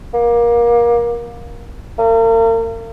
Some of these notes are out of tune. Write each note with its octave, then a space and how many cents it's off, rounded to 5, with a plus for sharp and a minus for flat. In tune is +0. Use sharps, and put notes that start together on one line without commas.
A#3 +25
A#3 -40